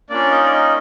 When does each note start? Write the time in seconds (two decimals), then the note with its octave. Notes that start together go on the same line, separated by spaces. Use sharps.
0.10 A#3 C#4 D4 F4 D5
0.31 D#4 D#5
0.44 D5
0.52 D#4 D#5